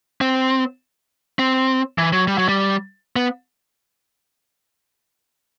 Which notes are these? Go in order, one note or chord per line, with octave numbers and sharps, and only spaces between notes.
C4
C4
E3
F#3
G3
F#3
G3
B3